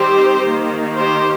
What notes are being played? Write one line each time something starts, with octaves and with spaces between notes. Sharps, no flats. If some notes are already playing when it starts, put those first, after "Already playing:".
Already playing: D#3 G3 C4 G4 C5
D#3 A#3
G4 C5